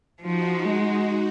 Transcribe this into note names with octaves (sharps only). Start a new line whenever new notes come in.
F3 D#4 F#4
G#3 D#4 F#4